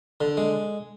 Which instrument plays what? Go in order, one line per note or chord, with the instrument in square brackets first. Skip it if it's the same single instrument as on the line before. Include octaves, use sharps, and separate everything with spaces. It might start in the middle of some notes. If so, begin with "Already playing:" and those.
[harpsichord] D3
G#3